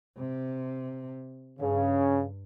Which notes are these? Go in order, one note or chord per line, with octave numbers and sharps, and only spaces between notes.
C3
G2 C#3